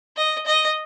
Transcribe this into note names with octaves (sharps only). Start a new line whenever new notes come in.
D#5
D#5